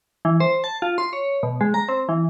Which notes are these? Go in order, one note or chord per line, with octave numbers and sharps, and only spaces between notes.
E3
C5
A5
F4
C6
C#5
B2
G#3
A#5
C4
E3